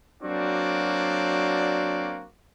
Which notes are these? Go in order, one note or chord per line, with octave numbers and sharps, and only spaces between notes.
F#3 A#3 C4 D4 F#4 D5